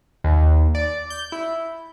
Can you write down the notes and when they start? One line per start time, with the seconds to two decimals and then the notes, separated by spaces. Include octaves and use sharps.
0.24 D#2
0.75 D5
1.10 G6
1.32 E4